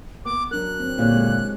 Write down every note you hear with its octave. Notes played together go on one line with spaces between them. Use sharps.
B3 D6
F#3 D4 A#4 F#6
C4
A#2 D3 E4 G4 C#5
G#3